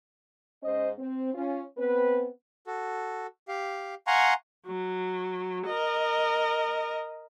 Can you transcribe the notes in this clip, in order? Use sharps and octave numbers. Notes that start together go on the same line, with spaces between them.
G#2 C#4 C5 D#5
C4
C#4 F4
B3 C4 B4
F#4 A4
G4 F5
F5 F#5 G#5 A#5 C6 C#6
F#3
A#4 D#5